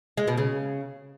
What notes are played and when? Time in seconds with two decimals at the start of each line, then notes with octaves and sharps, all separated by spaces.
0.17 G#3
0.27 B2
0.38 C#3